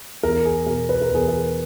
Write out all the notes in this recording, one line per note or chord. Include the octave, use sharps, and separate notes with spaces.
E2 A#4
G#4
B2 A#4
B4
A#4
E2 G#4
A#4